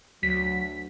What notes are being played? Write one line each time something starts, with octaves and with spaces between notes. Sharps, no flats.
D2 F#3 B6